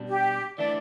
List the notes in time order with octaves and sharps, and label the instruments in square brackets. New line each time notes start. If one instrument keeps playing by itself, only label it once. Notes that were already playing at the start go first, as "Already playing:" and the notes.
Already playing: [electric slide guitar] B2 G3 D4
[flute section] G4
[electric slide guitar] E3 A3 D4 [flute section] D5